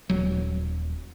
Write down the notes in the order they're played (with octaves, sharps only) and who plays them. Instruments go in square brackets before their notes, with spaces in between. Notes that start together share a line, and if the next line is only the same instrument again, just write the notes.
[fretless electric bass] D#1 F#3